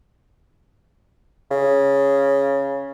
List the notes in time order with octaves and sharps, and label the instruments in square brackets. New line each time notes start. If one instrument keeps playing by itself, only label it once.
[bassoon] C#3